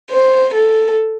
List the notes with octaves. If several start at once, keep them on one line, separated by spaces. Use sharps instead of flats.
C5
A4